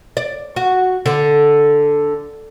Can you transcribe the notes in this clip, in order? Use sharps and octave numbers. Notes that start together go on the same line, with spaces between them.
D5
F#4
D3